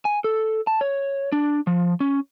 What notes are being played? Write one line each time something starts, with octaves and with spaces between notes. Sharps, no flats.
G#5
A4
A5
C#5
D4
F3
C#4